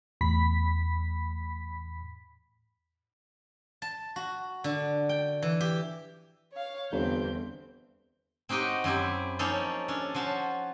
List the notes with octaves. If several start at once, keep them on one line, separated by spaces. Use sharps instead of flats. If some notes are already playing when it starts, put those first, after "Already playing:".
E2 A2 B5 B6
A5
F#4
D3
G5
E3
G4
C#5 F5
G1 E2 C4 G6
C4 D#4 F#4 G4 D#5
F#2 C4 E4 G4
F3 A#3 C#4 D#4 A4
C#4 D4 A4
F3 C#4 F#4 C5